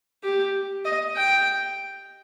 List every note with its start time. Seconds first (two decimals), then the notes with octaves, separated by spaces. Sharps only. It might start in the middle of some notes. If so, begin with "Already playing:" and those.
0.24 G4
0.85 D#5
1.16 G5